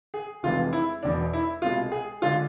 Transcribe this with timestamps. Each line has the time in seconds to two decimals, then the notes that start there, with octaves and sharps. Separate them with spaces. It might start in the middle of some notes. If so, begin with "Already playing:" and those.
0.14 G#4
0.43 F1 F2 E3 G#3 F4
0.73 E4
1.02 E1 E2 B2 D4
1.33 E4
1.62 C2 B2 G#3 F4
1.92 G#4
2.22 D3 G#3 F4